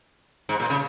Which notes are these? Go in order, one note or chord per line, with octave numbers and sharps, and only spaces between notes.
G#2
A#2
C#3